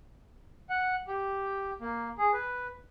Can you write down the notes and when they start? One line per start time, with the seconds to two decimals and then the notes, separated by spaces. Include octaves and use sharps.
0.69 F#5
1.07 G4
1.81 A#3
2.18 G#4
2.33 B4